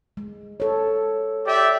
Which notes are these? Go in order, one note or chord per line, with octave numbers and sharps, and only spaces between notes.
G#3
A4 C#5
G4 D5 E5